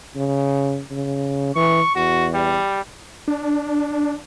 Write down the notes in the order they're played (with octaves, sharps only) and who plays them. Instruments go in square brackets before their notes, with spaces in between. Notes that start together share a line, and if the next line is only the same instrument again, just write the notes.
[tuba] C#3
C#3
[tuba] E3 [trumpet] C#6
[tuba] E2 [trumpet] F#4
[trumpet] G3
[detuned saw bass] D4